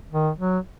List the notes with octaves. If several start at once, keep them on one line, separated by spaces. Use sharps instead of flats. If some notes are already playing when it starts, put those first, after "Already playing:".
D#3
F#3